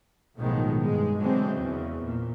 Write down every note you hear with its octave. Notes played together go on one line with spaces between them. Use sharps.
B1 A2 D#3 F3 G#3 B3
G2 G#3
D3 E3 F#3 G#3 C4
E2 C#3
A#2